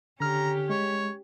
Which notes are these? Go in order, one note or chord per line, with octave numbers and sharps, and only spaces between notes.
D3 C#4 G4 A#5 F6
G#3 C#5